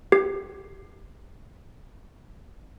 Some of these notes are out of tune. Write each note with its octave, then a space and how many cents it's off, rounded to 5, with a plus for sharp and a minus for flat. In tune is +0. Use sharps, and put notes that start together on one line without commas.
G4 +0